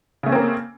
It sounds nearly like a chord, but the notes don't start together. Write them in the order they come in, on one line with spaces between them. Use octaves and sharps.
C#3 A3 C#4 C4 A#3